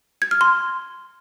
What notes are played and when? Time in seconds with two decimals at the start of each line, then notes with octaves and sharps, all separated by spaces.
0.22 G#6
0.31 F6
0.41 C6